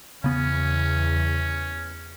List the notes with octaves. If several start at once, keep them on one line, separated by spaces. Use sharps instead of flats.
E2 C#3 B3 C#4